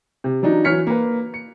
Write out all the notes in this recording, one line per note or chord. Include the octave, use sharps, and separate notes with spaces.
C3
E3 F#3 D4 D#4
E3 F#3 C#5 F6 B6 C#7
A#3 B4
C#7